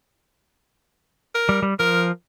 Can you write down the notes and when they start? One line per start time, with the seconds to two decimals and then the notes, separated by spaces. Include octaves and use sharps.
1.35 A#4
1.49 G3
1.63 G3
1.80 F3 A#4